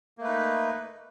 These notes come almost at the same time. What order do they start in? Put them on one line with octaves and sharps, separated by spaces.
A#3 A3 B4 D#4